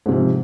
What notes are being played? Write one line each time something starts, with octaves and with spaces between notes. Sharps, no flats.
G#2 C3 F3